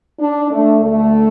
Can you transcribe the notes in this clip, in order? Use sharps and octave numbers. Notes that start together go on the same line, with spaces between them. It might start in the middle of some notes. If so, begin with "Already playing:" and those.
D4
A3
D2 D3 A3